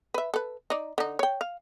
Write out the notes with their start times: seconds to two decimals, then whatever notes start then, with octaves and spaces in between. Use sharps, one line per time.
0.14 B4 E5
0.34 A4 B4
0.70 D#4 D5
0.98 D3 D#4
1.19 C#5 G5
1.41 F5